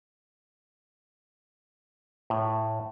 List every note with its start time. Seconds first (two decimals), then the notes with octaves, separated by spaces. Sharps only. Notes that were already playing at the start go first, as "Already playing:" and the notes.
2.30 A2